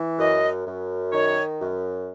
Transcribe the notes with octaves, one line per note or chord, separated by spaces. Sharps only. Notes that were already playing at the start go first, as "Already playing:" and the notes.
Already playing: E3
F#2 D#5
F#2
D#3 C#5
F#2